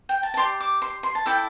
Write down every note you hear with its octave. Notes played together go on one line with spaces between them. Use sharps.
G5
A5
A5
G4 D5 C6
D6
C6
C6
A5
E4 A4 D5 G5